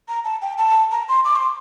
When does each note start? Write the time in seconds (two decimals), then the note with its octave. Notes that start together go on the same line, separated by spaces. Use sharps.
0.08 A#5
0.24 A5
0.42 G5
0.58 A5
0.91 A#5
1.09 C6
1.25 D6
1.36 C6